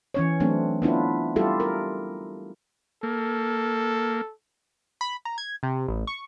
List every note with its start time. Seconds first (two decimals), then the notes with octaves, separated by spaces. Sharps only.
0.14 E3 C#4 C#5
0.40 F#3 A3 C4 D4
0.82 B3 D4 E4 F4
1.36 G3 E4 F4 G4 A4
1.60 A#4
3.03 A#3 A4
5.01 B5
5.25 A#5
5.38 G#6
5.63 C3
5.88 A1
6.07 C#6